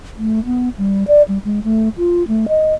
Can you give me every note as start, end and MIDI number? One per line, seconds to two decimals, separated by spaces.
0.17 0.43 57
0.45 0.69 59
0.78 1.04 55
1.08 1.22 74
1.28 1.38 55
1.44 1.60 56
1.64 1.89 57
1.97 2.26 65
2.28 2.46 57
2.48 2.74 75